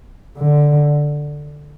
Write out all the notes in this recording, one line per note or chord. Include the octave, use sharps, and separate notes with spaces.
D3